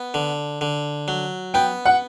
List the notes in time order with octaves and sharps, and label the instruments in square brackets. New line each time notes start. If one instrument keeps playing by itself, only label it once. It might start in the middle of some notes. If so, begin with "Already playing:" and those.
Already playing: [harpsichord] B3
D3
D3
F#3
[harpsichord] B3 [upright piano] G5
[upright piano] F#5